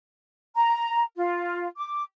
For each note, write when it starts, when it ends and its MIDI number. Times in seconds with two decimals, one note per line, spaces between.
0.56 1.03 82
1.16 1.67 65
1.77 2.03 86